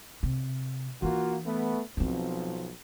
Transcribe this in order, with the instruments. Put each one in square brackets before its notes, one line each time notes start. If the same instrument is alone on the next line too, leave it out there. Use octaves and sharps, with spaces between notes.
[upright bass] C3
[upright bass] E3 D4 [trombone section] A#3 F4 F#4
[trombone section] A3 B3
[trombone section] B1 B2 F3 [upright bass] F#3 C4